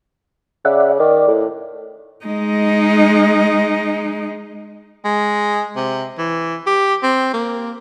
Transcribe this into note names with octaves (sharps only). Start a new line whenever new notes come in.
C#3 D5 E5 F#5
D#3 D5
A2
G#3 D#4
G#3
C3
E3
G4
C4
A#3